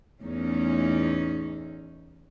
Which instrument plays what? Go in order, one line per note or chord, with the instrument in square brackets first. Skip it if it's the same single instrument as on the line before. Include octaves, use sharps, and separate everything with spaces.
[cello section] E2 A2 C#4 D#4